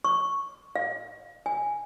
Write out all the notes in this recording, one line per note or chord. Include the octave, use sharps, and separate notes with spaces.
C#6
F5
G#5